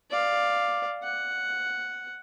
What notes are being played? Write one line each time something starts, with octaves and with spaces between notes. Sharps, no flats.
D5 F5
F#5